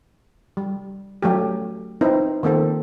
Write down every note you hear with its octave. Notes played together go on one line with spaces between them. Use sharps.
G3
F#3 A3 G4
C4 D#4 E4 A#4 B4
D#3 A#3 C4 A4